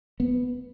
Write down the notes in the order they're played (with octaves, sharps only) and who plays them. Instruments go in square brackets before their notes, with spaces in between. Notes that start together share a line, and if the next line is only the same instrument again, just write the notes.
[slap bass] B3